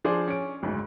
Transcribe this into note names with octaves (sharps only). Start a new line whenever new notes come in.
F3 D4 G#4 C5 D5
C#4 D7
F#1 D2 G#2